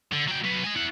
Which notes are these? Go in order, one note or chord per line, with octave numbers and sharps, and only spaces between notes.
D3
F#3 G5
F#3 B4
D#5 G#5
E4 F#5